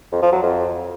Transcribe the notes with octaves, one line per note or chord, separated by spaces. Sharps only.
F2
F3
F#3
F2